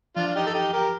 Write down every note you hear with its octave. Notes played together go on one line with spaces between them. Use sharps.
F3 D4 F4
F4
D#4 G4
A4
D#4 G4
G4 A#4